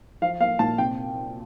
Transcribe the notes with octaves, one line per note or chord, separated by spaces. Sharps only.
F3 F5
A#3 F5
A#2 A5
C3 G5